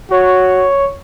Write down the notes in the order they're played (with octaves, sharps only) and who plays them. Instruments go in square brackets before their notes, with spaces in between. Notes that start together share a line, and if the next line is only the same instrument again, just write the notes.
[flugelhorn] F#4 [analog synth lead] C#5